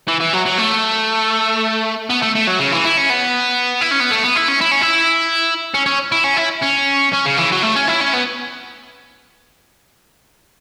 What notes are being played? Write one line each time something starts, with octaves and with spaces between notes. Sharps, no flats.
E3
E3
F#3
F#3
A3
B3
A3
A3
F#3
C#3
E3
E4
C#4
B3
E4
C#4
B3
A3
B3
E4
C#4
E4
C#4
E4
C#4
C#4
E4
C#4
E4
C#4
C#4
C#3
E3
F#3
A3
C#4
E4
C#4
B3